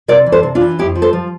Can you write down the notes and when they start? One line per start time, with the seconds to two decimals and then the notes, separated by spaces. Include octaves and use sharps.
0.08 C3 A#4 D5
0.26 E3
0.32 A4 C5
0.43 C3
0.55 D4 F4
0.61 E3
0.79 F2 E4 G4
0.95 F3
1.02 A4 C5
1.13 F3